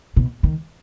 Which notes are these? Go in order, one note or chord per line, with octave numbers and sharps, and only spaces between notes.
B2
D#3